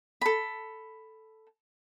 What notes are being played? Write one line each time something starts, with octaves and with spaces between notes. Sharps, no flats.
A4 B5